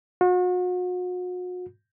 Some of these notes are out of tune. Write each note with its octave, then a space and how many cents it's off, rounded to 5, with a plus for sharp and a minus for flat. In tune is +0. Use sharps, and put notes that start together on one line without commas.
F#4 -40